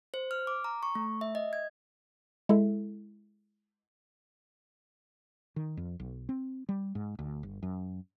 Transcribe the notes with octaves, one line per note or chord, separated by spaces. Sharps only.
C5
F6
D6
A#5
C#6
A3
E5
D#5
G#6
G#3 E4 A4 E5
D#3
F2
B1
C4
G3
G#2
D2
G1
F#2